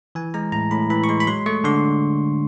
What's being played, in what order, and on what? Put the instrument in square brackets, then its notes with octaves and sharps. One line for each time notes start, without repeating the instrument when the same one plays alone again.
[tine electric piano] E3 G#5
G#3 A#5
A2 A#5
A2 B5
E3 B5
C#6
G#3 C6
B5
F#3 C6
A3 C#6
D3 C6